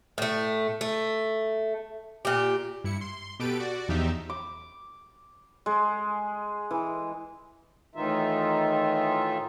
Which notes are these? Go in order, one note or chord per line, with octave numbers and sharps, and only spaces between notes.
A2 A3
A3
A#2 G4
G2 E4 C#7
C6
B2 G4 A4 B4 D7
F#4 D5
E2 F3 D#4 G4 E5
D6
G#3
E3
A2 D#3 E3 D#4 F4 E5